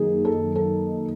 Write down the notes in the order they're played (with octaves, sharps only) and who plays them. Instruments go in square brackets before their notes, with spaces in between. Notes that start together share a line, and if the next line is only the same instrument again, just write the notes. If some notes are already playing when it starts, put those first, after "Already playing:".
Already playing: [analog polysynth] F#2 D#3 F#3 A#3 D#4 [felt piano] G#4
[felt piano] A4
A4